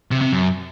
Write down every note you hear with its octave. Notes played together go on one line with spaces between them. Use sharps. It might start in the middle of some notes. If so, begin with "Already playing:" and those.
C3
C3
F#2